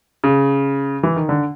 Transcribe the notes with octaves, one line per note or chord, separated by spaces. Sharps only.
C#3
E3
D#3
D3